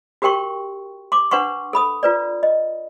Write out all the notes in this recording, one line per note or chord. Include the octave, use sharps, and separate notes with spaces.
F#4 G4 A#4 G5 C6 C#6
C6 D6
D4 B4 F#5 C6 C#6
A4 B5 D#6
F4 B4 D5
D#5